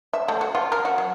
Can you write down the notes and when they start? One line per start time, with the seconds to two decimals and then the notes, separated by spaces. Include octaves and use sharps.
0.13 E5
0.28 A3
0.41 F#4
0.55 F4
0.72 A#4
0.85 F#4
0.98 F#3